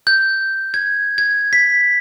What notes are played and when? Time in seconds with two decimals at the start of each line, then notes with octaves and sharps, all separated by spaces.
0.07 G6
0.74 G#6
1.18 G#6
1.53 B6